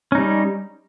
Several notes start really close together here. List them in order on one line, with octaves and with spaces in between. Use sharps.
C#4 D#4 G3